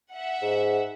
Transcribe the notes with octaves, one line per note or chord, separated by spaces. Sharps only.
E5 F#5
G#2